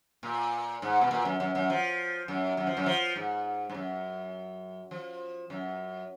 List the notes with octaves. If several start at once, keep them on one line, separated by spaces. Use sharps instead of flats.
A#2
G#2
B2
A#2
F#2
F#2
F#2
F3
F#2
F#2
F3
F#2
F3
G#2
G#2
F#2
F3
F#2